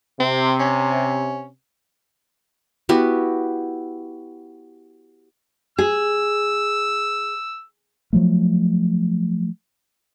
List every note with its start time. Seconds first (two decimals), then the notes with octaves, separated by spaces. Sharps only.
0.20 C3 C4
0.60 C#4
2.89 B3 E4 F#4 G4
5.79 G#4 E6
8.13 F3 F#3 A3